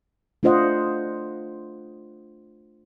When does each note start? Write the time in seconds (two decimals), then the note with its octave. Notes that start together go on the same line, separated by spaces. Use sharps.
0.43 A3 D4 F4 C5 D#5 F#5